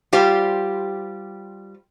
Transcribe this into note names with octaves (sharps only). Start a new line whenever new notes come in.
G3 F4 G4 C5